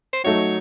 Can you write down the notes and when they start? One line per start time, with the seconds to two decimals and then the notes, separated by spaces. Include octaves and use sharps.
0.13 C5
0.24 F#3 A3 D#4 F#4 C#5